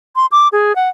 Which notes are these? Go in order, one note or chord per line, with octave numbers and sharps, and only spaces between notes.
C6
D6
G#4
F#5